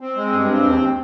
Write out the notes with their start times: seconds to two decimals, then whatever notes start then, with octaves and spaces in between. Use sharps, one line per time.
0.01 C4
0.17 G#3
0.32 G2
0.49 C4
0.65 D#2